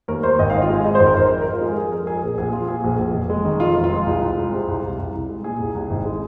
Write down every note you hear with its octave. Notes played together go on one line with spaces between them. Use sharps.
D#2 A#4
D#2 C5
G#1 D#5
F5
G#1
F4
G#3 G#4
G#2 D#5
G#1 C5
A#4
G#1 C5
F2
A#4
F2
F4
G#3 G#4
F3 G#4
F2 A#4
F2 G#4
A#1 G#4
A#1 G#4
F3 F4
A#2 G#4
A#1
A#1
F1
G#3
D#3
F2 F4
F1
F4
G#3
C2
C2
G#3
C3
C2
C2
C2
C2
G#3
A#2 G#4
C2
C2
G#1
G#3